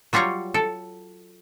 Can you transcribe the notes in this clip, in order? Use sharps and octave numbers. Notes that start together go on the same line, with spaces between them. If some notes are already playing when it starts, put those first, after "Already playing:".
F#3 G3 F4 C#5 A#5
A4